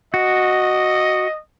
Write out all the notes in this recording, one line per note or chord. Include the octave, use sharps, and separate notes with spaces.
F#4 D#5